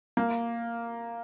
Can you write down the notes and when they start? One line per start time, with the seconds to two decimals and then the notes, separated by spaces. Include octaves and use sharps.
0.17 A#3